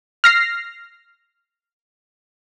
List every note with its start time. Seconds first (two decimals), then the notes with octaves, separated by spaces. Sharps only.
0.24 F6 A#6 C7